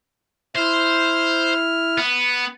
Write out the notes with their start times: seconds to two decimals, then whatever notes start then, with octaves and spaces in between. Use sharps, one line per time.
0.56 E4 C5 F6
1.98 B3